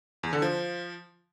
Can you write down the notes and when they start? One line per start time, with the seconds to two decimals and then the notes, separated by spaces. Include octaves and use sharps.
0.23 E2
0.33 D3
0.42 F3